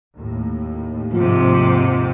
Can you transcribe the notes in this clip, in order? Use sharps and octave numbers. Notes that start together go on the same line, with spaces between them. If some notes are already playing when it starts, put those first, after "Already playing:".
D#2 A2
G#2 C3 F3